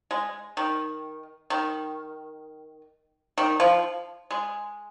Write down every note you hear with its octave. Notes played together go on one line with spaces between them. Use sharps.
G#3
D#3
D#3
D#3
F3
G#3